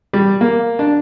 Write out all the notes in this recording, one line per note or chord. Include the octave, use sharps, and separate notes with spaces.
G3
A#3
D4